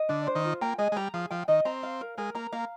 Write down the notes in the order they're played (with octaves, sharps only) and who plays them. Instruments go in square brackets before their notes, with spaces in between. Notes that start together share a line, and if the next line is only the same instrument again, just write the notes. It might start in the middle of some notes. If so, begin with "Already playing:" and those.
Already playing: [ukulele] D#5
[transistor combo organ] D3 [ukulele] D4
[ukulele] C5
[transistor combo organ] D#3
[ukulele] F4
[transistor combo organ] A#3 [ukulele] G5
[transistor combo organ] G#3 [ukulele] D#5
[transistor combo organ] G#3
[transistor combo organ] G3 [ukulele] A#5
[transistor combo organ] F3 [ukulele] G#4
[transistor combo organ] F3 [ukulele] G5
[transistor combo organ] D#3 [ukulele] D#5
[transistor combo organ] C4 [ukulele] A#5
[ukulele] F5
A#4
[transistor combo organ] G#3 [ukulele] A#4
[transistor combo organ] A#3 [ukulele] A#5
[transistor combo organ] A#3 [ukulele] F5